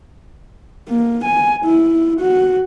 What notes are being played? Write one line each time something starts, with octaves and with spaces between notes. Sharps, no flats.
A#3
G#5
E4
F#4